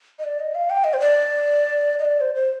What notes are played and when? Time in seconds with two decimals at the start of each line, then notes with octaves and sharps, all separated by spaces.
0.19 D#5
0.24 D5
0.40 D#5
0.55 F5
0.70 G5
0.84 D#5
0.93 C5
1.00 D5
1.99 D#5
2.05 D5
2.21 C5
2.35 C5